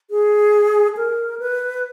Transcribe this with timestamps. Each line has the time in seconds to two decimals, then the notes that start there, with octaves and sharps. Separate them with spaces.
0.10 G#4
0.97 A#4
1.39 B4